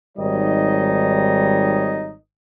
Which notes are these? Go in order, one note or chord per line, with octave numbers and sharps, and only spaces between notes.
G#1 G3 D#4 C#5 D#5